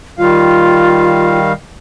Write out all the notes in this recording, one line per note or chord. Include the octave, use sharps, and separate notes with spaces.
D#3 G3 F4 F5